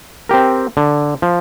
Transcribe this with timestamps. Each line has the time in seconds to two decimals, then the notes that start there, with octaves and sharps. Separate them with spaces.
0.29 C4 G4 A#4
0.77 D3
1.22 F3